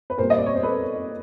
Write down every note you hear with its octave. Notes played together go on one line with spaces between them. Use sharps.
B4
A#2 G3 A#4 C5
D#5
D5
C#5
C5
A4 B4